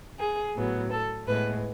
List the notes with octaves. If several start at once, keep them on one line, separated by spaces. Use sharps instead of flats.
G#4
A2 F#3 B3
A4
A2 G#3 B3 B4